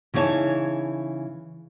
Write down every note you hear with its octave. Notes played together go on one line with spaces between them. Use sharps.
C#3 E3 D#4 G#4 C#5 A5